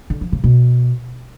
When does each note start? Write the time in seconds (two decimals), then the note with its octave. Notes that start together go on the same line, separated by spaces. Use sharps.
0.10 D3
0.21 F3
0.32 C#3
0.44 B2